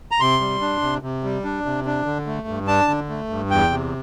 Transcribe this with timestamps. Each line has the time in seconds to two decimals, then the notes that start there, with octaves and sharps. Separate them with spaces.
0.11 A#5
0.20 C3 C6
0.40 G3
0.61 D4
0.82 C3
1.02 C3
1.24 G3
1.44 D4
1.65 C3
1.86 D4
2.06 D3
2.27 A3
2.48 G2
2.67 D4 A5
2.88 D3
3.09 A3
3.30 G2
3.51 E2 G5
3.71 C3